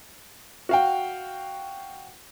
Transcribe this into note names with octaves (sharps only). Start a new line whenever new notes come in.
F#4 F5 G5